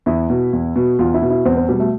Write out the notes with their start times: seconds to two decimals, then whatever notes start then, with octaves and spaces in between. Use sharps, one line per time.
0.06 E2 E4
0.30 B2
0.53 E2
0.76 B2
0.99 E2 F4
1.14 E4
1.22 B2
1.30 E4
1.45 E2 C4
1.57 C4
1.69 B2 G3
1.80 A3